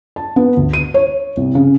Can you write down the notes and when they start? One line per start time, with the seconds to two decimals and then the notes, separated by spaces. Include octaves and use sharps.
0.16 A5
0.36 B3
0.57 D2
0.73 D#7
0.94 C#5
1.37 C2
1.55 C#3